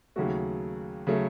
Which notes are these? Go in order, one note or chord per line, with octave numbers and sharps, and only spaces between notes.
D#2 C#3 F#3 A3 F#4
C#3 F#3 A3